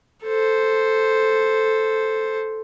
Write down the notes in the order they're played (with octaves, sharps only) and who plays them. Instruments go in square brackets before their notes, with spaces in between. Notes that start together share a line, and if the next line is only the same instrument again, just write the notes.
[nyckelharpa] A4 C5